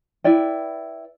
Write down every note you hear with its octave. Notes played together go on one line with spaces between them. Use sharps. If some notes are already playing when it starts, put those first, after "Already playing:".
E4 B4 D5 G5